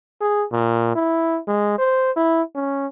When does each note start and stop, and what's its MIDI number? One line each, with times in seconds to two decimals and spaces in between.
0.21 0.44 68
0.52 0.95 46
0.96 1.39 64
1.48 1.78 56
1.79 2.11 72
2.17 2.42 64
2.55 2.87 61